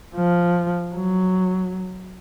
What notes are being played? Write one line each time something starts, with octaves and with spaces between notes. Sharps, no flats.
F3
F#3